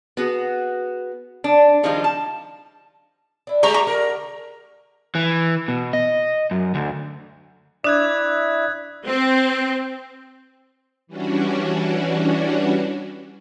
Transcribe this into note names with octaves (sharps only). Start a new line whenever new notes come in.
B3 F#4 G#4
D4
D#3 F3 G3 G#3 D4 F4
A5
D4 E4
G3 G#3 G4 A#5 C#6
A#3 B3 A#5 C#6
D3 A#4
E3
B2
D#5
F#2
D2
D4 E4 D5 E5 D#6 F#6 G#6
C4
E3 G3 C#4 D4 F#4